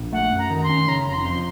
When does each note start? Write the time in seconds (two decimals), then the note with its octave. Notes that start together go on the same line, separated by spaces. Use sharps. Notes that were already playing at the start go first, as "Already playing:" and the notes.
Already playing: A#1
0.13 A3 F#5
0.32 F#2
0.38 A#5
0.50 D#3
0.58 A#5
0.63 C6
0.69 C#4
0.88 C#3 A#5
1.07 F1 A#5
1.13 C6
1.26 F2 C6